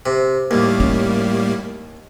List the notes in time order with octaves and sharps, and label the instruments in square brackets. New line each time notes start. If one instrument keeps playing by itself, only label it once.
[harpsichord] C3
[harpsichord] D#2 [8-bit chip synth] A2 G3 A#3
[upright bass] C#4